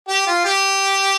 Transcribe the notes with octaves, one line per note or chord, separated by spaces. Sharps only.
G4
F4
G4